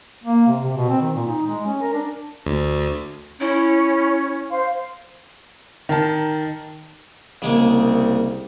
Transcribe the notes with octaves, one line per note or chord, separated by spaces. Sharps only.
A#3
C3
C3
B2
C4
D#3
A#2
D#4
G#3
C#4
A#4
D4
D2
C#4 E4
C5 F5 C6
D#3 A#4 A5
C2 C#3 G#3 A#3